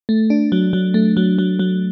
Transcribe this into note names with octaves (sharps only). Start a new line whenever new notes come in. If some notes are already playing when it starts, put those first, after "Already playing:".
A3
D4
F#3
F#3
A3
F#3
F#3
F#3